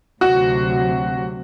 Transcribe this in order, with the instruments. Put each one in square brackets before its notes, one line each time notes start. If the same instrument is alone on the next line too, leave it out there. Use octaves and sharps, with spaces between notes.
[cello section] D2 C3 F#3 [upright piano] F#4